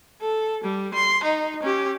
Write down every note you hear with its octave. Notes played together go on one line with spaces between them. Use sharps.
A4
G3
C6
D#4
C#4 G4